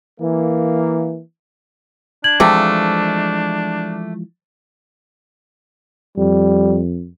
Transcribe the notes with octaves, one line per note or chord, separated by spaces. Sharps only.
E3 A#3
D4 G#6 F#7
C3 E3 F3 G#3 A3 D6
F2 G3